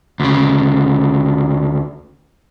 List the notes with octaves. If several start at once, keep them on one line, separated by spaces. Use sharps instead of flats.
D2 C#3